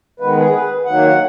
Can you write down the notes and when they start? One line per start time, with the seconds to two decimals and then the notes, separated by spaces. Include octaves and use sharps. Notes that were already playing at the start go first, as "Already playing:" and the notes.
0.20 D#3 G#3 B3 B4
0.37 G#4
0.53 B4
0.85 D#3 F#3 A#3 F#5